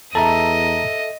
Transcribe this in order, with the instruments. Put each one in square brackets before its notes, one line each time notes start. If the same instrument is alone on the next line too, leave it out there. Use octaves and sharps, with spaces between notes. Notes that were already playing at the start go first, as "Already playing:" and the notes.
[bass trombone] E2 [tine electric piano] A4 E5 [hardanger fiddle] D#5 [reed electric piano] A5 A#5